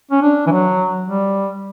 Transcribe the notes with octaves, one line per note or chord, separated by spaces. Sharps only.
C#4
D4
E3
F#3
G3